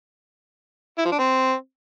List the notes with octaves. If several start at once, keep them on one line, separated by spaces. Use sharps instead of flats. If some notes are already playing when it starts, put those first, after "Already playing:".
E4
F3
D4
C4